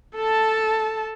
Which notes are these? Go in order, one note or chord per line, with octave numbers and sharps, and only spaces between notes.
A4 A5